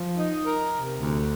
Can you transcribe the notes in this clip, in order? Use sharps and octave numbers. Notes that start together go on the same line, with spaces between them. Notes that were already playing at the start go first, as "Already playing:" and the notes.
Already playing: F3
D#4
A#4
C3
D2